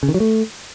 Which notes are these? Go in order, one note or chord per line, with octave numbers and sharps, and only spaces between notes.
C#3
D#3
F#3
A3